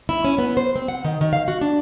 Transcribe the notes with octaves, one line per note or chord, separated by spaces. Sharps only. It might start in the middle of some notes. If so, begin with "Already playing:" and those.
E4
C#4
B3
C5
C4
F#5
D#3
D#3
F5
F#4
D4